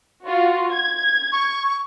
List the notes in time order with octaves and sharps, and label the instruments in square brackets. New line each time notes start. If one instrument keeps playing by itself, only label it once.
[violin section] F4 F#4
G#6
[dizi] C#6